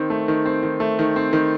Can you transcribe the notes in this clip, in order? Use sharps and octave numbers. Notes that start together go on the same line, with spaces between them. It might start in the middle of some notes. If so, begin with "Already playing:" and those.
Already playing: D#3 C4
A3
D#3
C4
D#3
A3
D#3
C4
D#3